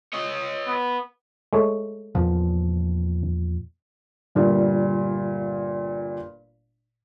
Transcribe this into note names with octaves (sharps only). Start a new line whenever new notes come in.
C#5 D#5
B3
G#3 A3 C#5
E2 A#2 F3
G1 A#2 G3